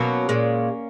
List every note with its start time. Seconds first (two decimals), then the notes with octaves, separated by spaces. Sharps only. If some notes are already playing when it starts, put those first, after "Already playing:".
Already playing: B2 F#3 A#3 C#4
0.29 A#2 G#3